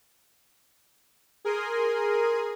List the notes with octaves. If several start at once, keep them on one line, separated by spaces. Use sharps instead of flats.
G#4 A#4 G#5 C6 D#6